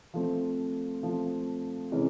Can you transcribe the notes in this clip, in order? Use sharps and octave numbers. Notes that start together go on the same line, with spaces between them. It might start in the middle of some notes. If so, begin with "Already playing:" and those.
F3 A3 C4
F3 A3 C4
C3 E3 G#3 C#4 E4